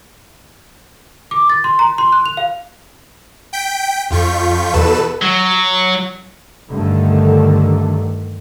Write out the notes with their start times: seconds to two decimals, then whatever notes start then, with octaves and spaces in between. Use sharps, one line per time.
1.31 D6
1.50 A6
1.64 C6
1.79 A#5
1.98 C6
2.12 F#6
2.26 F7
2.37 F5
3.53 G5 G6 B6 D7
4.10 F2 F4 C#6 G6 B6
4.73 E2 B2 A4 B4 E7
5.22 F#3
6.69 G2 D3 D#3 A3